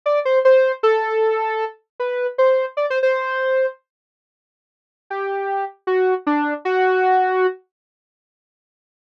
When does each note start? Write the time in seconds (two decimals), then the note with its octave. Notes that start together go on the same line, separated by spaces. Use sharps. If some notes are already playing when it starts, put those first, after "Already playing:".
0.06 D5
0.25 C5
0.45 C5
0.83 A4
2.00 B4
2.38 C5
2.77 D5
2.90 C5
3.03 C5
5.10 G4
5.87 F#4
6.27 D4
6.65 F#4